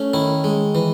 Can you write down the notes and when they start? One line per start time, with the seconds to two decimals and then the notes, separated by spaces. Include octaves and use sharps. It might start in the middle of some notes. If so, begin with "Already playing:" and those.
Already playing: A3 C#4
0.14 D#3 E4
0.44 G#3
0.75 E3